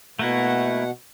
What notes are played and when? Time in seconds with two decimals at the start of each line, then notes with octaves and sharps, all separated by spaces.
0.19 B2 A3 A#3 E4 F#5